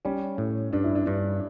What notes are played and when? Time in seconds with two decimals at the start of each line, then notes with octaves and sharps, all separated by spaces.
0.05 G3 C#4
0.38 A2
0.73 G2 D4
0.84 E4
0.95 D4
1.06 G2 D4